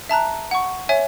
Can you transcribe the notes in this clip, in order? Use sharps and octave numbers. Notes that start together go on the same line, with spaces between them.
E5 A5 A#5 F#6
F#5 C#6
C#5 E5 G#5